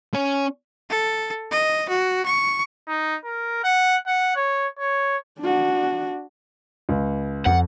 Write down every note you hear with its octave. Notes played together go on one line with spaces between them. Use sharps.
C#4
A4
D#5
F#4
C#6
D#4
A#4
F#5
F#5
C#5
C#5
D4 F#4
C#2
F2 F#5